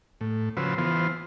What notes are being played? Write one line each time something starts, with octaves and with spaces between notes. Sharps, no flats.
A2
C#3 F3 F#4 B4 C5 E6
E3 B3 F4 C5